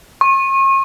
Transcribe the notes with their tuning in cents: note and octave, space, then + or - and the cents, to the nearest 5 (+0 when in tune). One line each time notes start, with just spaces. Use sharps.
C#6 -40